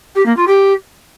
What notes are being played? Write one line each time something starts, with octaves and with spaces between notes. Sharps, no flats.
G4
A#3
F4
G4